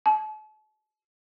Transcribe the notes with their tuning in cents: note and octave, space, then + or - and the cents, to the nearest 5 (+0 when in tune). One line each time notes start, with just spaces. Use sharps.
A5 -40